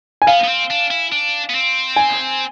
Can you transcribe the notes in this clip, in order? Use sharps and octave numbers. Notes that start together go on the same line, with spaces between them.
G#5
B3 F5
B3
C4
D4
E4
D4
B3
C4
G#5